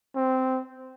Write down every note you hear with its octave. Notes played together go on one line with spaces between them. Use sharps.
C4